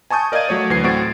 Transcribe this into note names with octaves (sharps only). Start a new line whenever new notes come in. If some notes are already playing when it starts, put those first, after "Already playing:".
G#5 A5 C#6 D#6 G6
A#4 D5 D#5 F5 G#6 D#7
F#3 A3 C#5 D5
D2 E3 G#6 C7
A2 C4 F#4 A6 D7